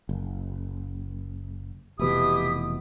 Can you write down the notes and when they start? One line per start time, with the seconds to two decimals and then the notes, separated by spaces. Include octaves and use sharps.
0.09 F#1
1.99 F1 B2 E3 E4 G4 D#6